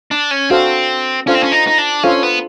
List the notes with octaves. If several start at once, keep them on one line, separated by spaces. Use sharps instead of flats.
D4
C#4
C4 D4 F#4 A4 C5 F5
C#4 D4 F4 A4 C5 F5
C4
C#4
D#4
D#4
D4
C#4 D4 F4 A4 C5 F5
B3